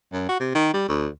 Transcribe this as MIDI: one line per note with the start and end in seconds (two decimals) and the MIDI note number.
0.13 0.24 42
0.29 0.38 66
0.40 0.52 48
0.55 0.73 51
0.74 0.86 55
0.89 1.08 38